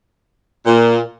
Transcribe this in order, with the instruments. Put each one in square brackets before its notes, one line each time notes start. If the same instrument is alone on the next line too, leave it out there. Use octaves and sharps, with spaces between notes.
[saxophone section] A#2